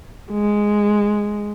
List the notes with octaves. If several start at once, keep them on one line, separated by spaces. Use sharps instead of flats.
G#3